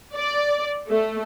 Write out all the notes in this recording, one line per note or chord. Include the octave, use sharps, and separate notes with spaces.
D5
A3